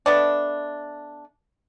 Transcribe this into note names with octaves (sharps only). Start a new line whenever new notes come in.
A3 B3 D4